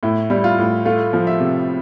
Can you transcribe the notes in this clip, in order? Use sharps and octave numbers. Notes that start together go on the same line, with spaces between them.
A2 E4
G3 E4
F4
A2
A3 F4
F3
E5
C3